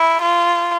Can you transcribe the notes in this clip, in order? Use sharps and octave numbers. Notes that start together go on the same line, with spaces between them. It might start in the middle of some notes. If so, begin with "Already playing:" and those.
Already playing: E4
F4